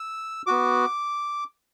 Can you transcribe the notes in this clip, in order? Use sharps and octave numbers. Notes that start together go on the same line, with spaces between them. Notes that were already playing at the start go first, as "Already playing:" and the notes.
Already playing: E6
B3 F#4 D6